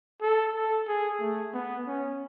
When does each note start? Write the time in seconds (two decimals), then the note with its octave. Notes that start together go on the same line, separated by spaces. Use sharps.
0.22 A4
0.55 A4
0.88 G#4
1.20 A3
1.54 B3
1.87 C#4